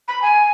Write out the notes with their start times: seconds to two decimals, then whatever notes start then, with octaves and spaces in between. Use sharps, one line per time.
0.08 B5
0.22 G#5